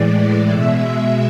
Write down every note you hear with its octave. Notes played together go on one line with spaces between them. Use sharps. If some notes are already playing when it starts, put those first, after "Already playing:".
Already playing: A2 E3 G#3 D5
B2 G#3 E5